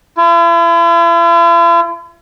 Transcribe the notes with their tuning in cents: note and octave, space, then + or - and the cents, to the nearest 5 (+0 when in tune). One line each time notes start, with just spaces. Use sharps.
E4 +45